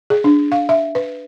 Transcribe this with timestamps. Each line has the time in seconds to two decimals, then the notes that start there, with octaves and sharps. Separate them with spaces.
0.10 G#4
0.24 D4
0.52 F5
0.69 E5
0.95 B4